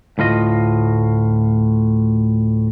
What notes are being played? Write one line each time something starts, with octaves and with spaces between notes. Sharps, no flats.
D2 A2 F4 D#5